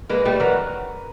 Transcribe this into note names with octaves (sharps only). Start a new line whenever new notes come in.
G#3 A#3 B4
G3 A3
E3 F#3 A#4